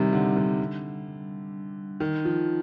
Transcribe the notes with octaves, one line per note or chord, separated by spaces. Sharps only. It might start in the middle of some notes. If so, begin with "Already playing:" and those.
Already playing: C3 D#3 G3
D3
D3
D#3
F3